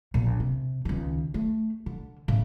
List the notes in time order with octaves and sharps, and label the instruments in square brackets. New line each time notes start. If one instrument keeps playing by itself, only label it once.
[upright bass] A#1 D3
C3
C#2 D#3
A3
D3
A2 C#3